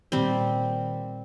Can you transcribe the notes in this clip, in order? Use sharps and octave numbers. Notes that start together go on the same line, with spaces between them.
A#2 D#3 G3 C4